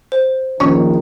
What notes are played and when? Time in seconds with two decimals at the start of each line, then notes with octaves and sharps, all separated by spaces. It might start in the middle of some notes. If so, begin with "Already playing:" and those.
0.12 C5
0.60 A#1 D#3 C#4